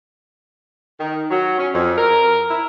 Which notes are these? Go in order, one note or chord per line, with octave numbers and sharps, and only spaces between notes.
D#3
F#3
C#4
F2
A#4
E4